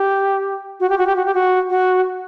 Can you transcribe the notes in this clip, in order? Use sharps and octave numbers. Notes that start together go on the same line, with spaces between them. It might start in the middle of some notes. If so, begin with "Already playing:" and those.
Already playing: G4
F#4
G4
F#4
G4
F#4
G4
F#4
F#4